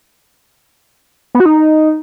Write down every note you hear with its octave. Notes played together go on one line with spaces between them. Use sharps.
B3
F#4
D#4